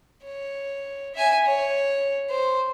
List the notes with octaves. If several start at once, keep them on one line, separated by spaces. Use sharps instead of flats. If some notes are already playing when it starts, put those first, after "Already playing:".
C#5
E5 G#5
C#5
C5